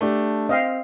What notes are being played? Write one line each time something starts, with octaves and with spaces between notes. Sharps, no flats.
A3 D4 G4
C4 D#5 F5 G5